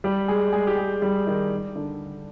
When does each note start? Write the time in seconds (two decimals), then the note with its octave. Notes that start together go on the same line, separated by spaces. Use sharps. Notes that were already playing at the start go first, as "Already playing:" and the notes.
0.04 G3 G4
0.28 G#3 G#4
0.53 G#3 G#4
0.67 G4
0.78 G#3 G#4
1.02 G3 G4
1.27 D#3 D#4
1.76 D3 D4